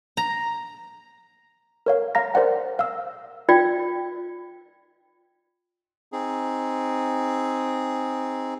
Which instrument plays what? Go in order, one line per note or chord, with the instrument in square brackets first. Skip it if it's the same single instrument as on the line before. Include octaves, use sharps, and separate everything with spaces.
[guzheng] A#5
[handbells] A#4 C#5 F5
F5 A#5 A#6
A#4 C5 D5 F#5 G5
F5 E6
[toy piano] F4 D5 G5
[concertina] C4 D#4 G#4